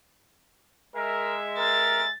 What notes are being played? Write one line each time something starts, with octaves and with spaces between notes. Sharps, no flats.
G#3 A#4 E5
A#4 A6